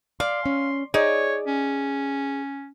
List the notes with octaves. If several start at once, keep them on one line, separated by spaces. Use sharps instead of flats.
D5 F5 C6
C#4
D#4 G#4 C#5 D5
C#4